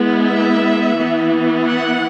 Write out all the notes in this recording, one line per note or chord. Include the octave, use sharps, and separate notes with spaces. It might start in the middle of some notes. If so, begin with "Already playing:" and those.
Already playing: G#3 B3 E4
E5
E3 B3 E4
F#5